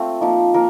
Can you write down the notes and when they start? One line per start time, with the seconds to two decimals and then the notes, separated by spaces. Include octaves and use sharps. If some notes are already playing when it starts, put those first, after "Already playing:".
Already playing: A3 C4 F4
0.21 F3 A#3 D#4
0.54 F3 A#3 A#4